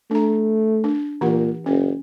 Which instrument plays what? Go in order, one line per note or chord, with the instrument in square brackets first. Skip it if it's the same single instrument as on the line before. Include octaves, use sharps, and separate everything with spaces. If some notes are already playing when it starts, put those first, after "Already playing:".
[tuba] A3 [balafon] D4 A#5
[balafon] D4
[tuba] A#2 [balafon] E3 G4 F#5
[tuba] F#1 [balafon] C#4